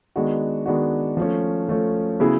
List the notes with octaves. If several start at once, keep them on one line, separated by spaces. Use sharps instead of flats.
D#3 G#3 B3 D4 F#4
D#3 G#3 B3 D4 F#4
F3 A3 C#4
F3 A3 C#4
C#3 F#3 B3 E4 G#4